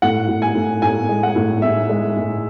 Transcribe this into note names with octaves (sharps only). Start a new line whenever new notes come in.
A2 F#5
A2
G#5
A2
A2 G#5
G#3
F#5
A2
A2 E5
G#3
A2